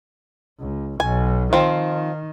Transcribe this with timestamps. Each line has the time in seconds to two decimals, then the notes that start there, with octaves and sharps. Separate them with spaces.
0.59 C#2
1.00 B1 G#5
1.53 D#3 F3 C4